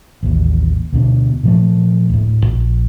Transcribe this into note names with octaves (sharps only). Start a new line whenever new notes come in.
A1 D#2
D2 B2 D3
A#2 F3 A3
D1 A2
A#1